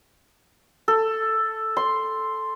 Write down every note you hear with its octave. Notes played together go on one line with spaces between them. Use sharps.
A4
C6